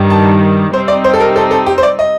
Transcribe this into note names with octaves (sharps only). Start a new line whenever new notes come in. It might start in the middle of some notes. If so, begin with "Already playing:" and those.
Already playing: G2 D#3 G3
A5
C3 G3 C4 D#4 C5
D5
C5
A4
A#4
A4
A4
G4
C5
D5
D#5